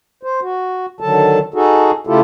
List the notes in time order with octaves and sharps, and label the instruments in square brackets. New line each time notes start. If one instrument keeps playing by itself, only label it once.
[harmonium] C5
F#4
D3 D#3 F#3 A4 A5
D#4 F#4 G#4 A4
C#3 A3 E4 F4 G4 A4